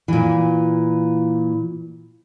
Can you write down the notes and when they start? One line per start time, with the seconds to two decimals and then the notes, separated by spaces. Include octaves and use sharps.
0.08 A#2 E3